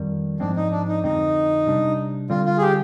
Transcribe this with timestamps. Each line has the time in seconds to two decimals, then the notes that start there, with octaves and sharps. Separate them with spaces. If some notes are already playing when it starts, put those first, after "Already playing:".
Already playing: F2 D#3 G3
0.40 G#2 F3 G#3 C4 D4
0.56 D#4
0.71 D4
0.88 D#4
1.04 F2 D3 G#3 C4 D#4
1.67 C3 G3 D4
2.30 D3 G3 C4 F4
2.46 F4
2.58 G#4
2.62 G4